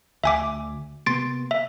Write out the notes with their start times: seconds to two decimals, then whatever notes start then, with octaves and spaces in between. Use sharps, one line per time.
0.24 D2 E5 G#5 D6
1.06 C3 A#3 B3 C6 A6 D7
1.51 E5